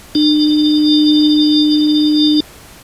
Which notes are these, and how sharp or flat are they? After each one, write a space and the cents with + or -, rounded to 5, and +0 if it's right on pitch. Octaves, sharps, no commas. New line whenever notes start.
D4 +45